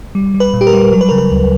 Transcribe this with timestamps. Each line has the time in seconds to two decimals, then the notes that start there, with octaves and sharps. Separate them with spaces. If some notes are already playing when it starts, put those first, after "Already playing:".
0.15 G3
0.34 G3
0.40 B4
0.54 A#2
0.61 G4
0.67 A#4
0.73 G3
0.93 F#3 A#4
1.01 B4
1.09 A#4
1.11 C#3
1.18 B4
1.31 D2